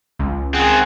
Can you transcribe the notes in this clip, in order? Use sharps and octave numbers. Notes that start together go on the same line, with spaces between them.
C#2
D#3 C4 G#4 F#5